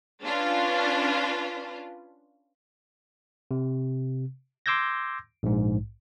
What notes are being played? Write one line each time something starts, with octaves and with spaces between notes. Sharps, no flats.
C#4 D4 F4 B4
C3
C6 D6 E6 G6 G#6 A#6
A#1 G#2